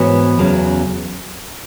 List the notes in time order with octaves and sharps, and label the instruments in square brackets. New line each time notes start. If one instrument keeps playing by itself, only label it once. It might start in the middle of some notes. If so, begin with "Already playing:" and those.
Already playing: [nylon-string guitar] G#2 E3 B3 F#4 C#5
E2 C#3 F#3 C#4